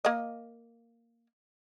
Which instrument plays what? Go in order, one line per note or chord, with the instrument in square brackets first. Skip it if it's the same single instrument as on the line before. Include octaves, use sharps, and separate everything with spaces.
[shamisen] A#3 D#5